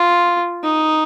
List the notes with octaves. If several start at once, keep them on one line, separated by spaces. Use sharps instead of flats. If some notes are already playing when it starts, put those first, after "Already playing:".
Already playing: F4
D#4